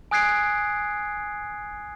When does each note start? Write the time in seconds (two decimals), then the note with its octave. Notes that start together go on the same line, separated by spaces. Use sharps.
0.11 G#5 D#6 F#6 G#6 C7 D7